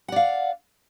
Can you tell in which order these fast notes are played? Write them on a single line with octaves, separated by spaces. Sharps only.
F#5 D5 F5